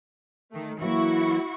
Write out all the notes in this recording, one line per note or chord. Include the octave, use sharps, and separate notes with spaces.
D#3 A3
E3 F#3 A#3 E4 F#4 C#6